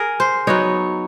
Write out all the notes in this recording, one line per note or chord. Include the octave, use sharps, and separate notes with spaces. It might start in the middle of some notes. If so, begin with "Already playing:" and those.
Already playing: G#4 A#4
C5
F#3 B3 D#4 C#5